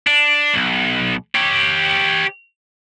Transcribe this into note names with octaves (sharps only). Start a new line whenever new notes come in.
D4
B1
G4 C#5